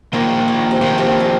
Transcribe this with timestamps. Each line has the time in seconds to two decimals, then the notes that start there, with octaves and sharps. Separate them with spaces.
0.13 A#2 D#3 A#3 F4 C5
0.48 D#3
0.71 C3
0.81 A#2 D#3 A#3 F4 C5
0.98 C3
1.20 D#3